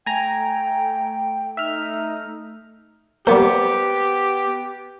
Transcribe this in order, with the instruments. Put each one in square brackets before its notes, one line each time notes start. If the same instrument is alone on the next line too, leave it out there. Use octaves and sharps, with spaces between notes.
[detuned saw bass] A3 [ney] G5 [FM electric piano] G#5 A#5
[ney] D#4 [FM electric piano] E5 F6
[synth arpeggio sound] G3 A#3 [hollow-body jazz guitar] B3 C5 [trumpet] G4